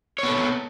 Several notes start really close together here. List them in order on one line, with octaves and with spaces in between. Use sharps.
C#5 B3 A4